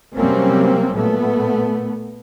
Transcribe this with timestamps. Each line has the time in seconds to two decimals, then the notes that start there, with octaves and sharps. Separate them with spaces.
0.15 C3 F#3 G3 A#3 C4 C#4
0.96 A#2 A3 B3